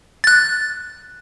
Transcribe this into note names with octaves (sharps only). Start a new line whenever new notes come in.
F#6 A6